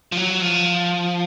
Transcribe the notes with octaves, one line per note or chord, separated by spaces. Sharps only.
F3
F#3
F3